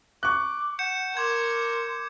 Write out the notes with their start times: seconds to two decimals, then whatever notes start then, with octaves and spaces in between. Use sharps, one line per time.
0.23 C#6 D6 F#6
0.79 F#5 G6 C#7 E7
1.17 A#4 C6 D6 G#6